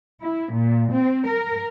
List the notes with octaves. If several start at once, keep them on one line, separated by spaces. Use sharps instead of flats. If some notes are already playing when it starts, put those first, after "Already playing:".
E4
A#2
C4
A#4